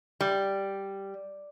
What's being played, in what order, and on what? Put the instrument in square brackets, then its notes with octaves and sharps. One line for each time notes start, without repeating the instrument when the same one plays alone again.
[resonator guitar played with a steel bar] G3